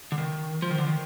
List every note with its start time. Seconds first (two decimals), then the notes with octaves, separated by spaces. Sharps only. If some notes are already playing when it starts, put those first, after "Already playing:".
0.12 D3
0.18 D#3
0.62 F3
0.71 D#3
0.78 D3
0.87 D#3